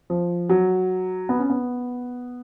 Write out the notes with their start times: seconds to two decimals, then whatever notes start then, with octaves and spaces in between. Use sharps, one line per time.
0.10 F3
0.49 F#3
1.29 B3
1.39 C#4
1.50 B3